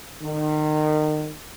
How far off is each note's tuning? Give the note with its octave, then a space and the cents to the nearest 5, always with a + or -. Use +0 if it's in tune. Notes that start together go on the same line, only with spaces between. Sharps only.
D#3 -30